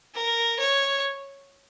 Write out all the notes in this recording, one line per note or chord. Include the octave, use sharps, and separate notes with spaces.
A#4
C#5